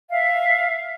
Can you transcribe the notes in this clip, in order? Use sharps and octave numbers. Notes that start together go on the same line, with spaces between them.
E5 F5